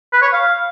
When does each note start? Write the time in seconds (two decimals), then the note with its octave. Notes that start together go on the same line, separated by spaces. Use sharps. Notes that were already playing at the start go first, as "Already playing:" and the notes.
0.13 B4
0.22 C#5
0.33 F5